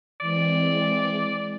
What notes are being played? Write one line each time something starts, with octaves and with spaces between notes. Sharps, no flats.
E3 G#3 C4 D5